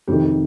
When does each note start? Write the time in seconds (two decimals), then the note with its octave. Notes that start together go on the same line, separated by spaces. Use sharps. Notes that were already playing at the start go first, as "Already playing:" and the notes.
0.07 F2 C3 D#3 G4
0.23 G4